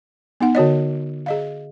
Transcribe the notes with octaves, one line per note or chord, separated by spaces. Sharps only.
B3 D#4 F#5
D3 F#4 C#5 D#5
G#4 D#5 F5